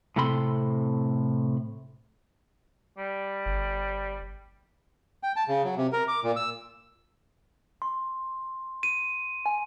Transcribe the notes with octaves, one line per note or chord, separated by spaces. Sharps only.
A2 C3 C4 A4 B5 C6
G3
G1
G5
A5
C#3
F#3
C3
A#4
D6
A#2
E6
C6
D#7
G#5